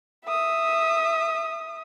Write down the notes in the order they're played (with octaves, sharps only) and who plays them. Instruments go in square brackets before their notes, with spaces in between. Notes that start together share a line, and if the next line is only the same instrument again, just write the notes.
[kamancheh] E5 D#6